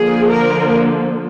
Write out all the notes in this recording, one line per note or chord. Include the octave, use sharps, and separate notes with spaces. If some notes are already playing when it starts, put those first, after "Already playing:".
Already playing: D3 F3 A#3 G#4
A#4